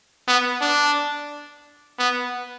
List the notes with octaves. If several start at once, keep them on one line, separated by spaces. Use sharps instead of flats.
B3
D4
B3